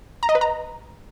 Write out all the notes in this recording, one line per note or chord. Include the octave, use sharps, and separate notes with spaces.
A#5
D#5
B4
A#5